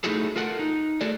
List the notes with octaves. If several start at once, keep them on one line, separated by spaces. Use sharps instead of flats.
A3 D#4 E4 F#4 G#4 A4
F4 A4 A#4 F#5
D#4
A3 F#4 G#4 A4 D5